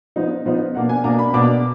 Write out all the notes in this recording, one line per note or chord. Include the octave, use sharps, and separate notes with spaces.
F3 B3 D#4
F3 B3 D#4
B2 A#3 D4 F#5
G#5
B2 A#3 D4 A#5
B5
B2 A#3 D4 D6